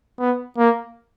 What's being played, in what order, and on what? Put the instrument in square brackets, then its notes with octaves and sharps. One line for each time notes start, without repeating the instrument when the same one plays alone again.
[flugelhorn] B3
A#3